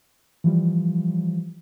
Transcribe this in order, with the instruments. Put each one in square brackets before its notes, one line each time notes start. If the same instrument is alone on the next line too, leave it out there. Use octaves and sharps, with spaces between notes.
[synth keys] E3 F3 G3